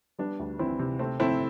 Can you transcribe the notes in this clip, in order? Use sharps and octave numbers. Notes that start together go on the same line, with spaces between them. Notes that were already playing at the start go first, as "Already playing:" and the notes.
G3 B3 D4
D2
E3 C4 E4
C3
A3 C4
A3 C4 E4